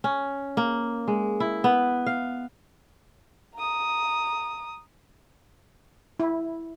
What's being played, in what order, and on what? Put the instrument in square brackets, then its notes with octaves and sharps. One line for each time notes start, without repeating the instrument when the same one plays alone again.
[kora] C#4
A#3
G#3
E4
B3
F5
[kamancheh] A#5 D#6
[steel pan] E4